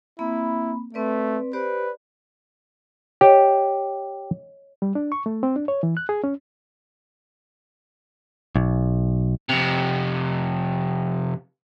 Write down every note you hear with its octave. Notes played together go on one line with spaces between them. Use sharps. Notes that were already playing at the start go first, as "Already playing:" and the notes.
A#3 C4 E4 B5
A3 C4 B4 D5
G4 B4 C5 D5
G4 C#5 D#5
G3
D4
C#6
A3
C4
D4
C#5
E3
F#6
G#4
C#4
B1
F2 C3